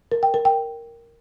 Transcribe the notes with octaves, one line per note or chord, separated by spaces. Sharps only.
A#4
G5
A#4
G5